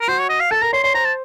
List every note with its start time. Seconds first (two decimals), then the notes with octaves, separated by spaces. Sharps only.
0.01 A#4
0.08 F#4 C5
0.19 C#5
0.30 D#5
0.40 F5
0.51 A4 A5
0.62 A#4 A#5
0.73 C#5 C6
0.83 C#5 C6
0.94 C5 A#5
1.05 A5